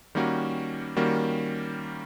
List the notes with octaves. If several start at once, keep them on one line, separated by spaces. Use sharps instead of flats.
D#3 G3 A#3 C#4 F#4
D#3 G3 A#3 C#4 F#4